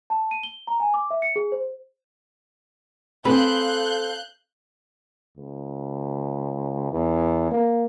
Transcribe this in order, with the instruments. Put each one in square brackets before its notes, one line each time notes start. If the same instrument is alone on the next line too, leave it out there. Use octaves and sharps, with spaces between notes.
[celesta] A5
D#7
G7
A#5
G#5
D6
E5
C#7
G#4
C5
[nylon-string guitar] C4 G#4 [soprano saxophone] A4 [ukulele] B4 [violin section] F5 F#6 G6
[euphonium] C#2
E2
A#3